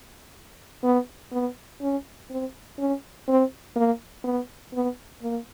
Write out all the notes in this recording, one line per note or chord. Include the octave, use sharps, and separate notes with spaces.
B3
B3
C#4
C4
C#4
C4
A#3
B3
B3
A#3